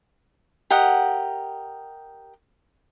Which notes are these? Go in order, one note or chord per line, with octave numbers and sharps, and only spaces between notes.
G4 A#4 D#5 F#5